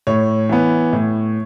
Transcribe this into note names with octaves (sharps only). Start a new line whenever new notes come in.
A2 C#5
E3 B3
A2